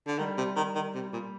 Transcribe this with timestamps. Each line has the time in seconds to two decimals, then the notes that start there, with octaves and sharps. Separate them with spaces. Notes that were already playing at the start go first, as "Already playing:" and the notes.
0.07 D3
0.18 D#3 G3
0.37 C3
0.56 D#3
0.75 D#3
0.94 C3
1.13 A#2